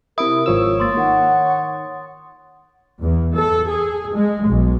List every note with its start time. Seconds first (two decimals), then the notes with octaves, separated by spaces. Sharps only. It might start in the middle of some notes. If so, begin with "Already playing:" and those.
0.18 C3 E4 A#4 D#6 D7
0.46 G#1 F3 C#5 E6
0.80 A#3 C6 D#6 A6
0.97 D#3 F#5
3.02 E2
3.36 A4
3.68 G#4
4.15 G#3
4.48 B1